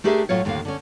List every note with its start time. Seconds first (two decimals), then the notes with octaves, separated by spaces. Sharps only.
0.04 A3 D4 G4 G#4 A#4 E5
0.29 A2 F#3 F4 C#5
0.45 D#2 A2 D3 A#3 F5
0.65 D3 C#4